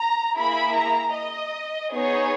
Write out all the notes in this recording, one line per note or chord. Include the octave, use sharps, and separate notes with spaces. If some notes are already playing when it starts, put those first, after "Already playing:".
Already playing: A#5
A#3 E4 G#4 B5
A#5
D#5
B3 D#4 G#4 C#5